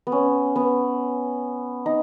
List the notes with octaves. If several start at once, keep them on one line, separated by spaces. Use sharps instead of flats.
B3
C#4
B3
D#4